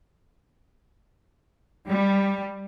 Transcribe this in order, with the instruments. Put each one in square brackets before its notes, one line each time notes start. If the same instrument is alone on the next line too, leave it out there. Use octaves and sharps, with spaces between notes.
[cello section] G3